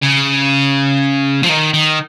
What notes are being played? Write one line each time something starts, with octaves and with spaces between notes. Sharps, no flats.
C#3
F3
D#3
D#3